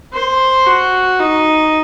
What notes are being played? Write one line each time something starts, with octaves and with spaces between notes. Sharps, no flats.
C5
F#4
D#4